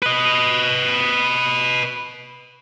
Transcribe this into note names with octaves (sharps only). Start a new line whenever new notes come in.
B4 D#5